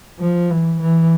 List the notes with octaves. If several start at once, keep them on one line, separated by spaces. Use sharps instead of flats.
F3
E3
E3